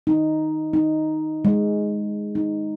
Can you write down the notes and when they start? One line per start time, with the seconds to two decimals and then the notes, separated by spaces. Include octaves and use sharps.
0.07 D#4
0.73 D#4
1.45 G#3
2.35 D#4